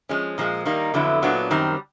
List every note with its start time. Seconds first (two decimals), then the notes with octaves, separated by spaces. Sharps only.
0.09 F3 G#3 C#4
0.38 A#2 F3 G#3
0.65 D#3 G3 A#3 D#4
0.94 F2 D3 F#3 B3 E4
1.22 A#2 F#3 B3 D4
1.51 F#2 D#3 G3 C4